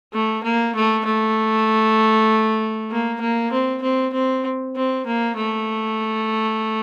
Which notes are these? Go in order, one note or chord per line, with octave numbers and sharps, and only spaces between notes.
A3
A#3
A3
A3
A#3
A#3
C4
C4
C4
C4
A#3
A3